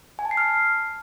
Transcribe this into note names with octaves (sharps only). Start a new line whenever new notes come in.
G#5
A5
C7
F6